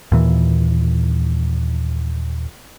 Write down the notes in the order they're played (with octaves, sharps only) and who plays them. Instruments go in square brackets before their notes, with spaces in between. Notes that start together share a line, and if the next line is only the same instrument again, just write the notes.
[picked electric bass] D#2 A#2 E3